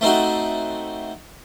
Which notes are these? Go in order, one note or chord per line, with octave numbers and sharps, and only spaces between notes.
A3 C4 D#4 F#4